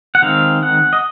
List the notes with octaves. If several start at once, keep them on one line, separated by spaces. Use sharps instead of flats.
F#5
D#3 G#3 C4 F5
F#5
D#5